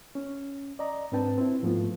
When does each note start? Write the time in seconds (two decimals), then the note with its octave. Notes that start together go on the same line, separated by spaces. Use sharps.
0.15 C#4
0.79 D5 D#5 A#5
1.12 G#2 C4 D4 B4 G5 A5
1.38 C4 E4
1.62 G#2 F3 A3 B3 F4